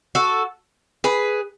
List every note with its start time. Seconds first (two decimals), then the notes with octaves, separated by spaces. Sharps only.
0.15 F#4 A4
1.04 G#4 B4